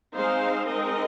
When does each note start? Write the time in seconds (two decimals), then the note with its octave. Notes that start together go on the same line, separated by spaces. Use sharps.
0.14 G#3 C4 D#4 C5 F5
0.66 G#3 C4 D#4 A#4 D#5